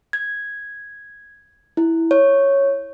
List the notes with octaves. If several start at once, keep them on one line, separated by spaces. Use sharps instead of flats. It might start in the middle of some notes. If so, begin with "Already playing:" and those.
G#6
E4
C#5